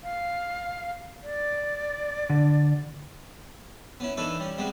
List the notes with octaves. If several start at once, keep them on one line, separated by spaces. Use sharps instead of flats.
F5
D5
D3
B3 C#4 E4
D#3 E3 D4 A4 B4 C#5
G3 C#4
C3 G3 G#3 B3 F#4